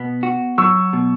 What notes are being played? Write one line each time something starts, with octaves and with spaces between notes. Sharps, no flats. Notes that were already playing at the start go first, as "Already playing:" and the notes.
Already playing: B2 B3
F#4
F#3 C#6 E6
B2